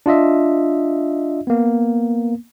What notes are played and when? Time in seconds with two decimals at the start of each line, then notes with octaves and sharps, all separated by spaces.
0.06 D4 F4 D#5 E5
1.47 A#3 B3